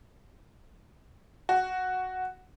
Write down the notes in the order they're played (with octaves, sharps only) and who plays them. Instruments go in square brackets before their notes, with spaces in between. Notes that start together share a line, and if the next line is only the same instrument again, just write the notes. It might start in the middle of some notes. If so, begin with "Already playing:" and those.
[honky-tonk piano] F#4